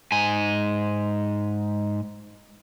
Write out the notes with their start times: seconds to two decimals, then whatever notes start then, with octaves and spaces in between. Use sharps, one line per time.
0.12 G#2 G#5